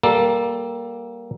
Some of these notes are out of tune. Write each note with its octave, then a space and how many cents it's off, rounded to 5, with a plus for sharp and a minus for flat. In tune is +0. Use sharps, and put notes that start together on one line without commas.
G3 +0 A#3 +15 A4 +0